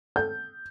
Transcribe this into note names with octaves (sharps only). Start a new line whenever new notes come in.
G6